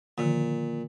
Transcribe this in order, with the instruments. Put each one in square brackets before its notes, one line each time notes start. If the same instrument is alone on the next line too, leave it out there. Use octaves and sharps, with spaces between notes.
[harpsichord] A#2 [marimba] D3 D#3 F3